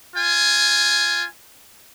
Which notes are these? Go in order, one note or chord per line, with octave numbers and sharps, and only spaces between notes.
F4 G#5